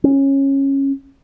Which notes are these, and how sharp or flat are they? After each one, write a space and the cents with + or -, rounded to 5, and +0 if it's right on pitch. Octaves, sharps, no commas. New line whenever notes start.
C#4 -15